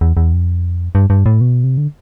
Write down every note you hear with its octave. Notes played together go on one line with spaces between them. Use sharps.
E2
E2
F2
G2
G2
A2
B2
C3
D3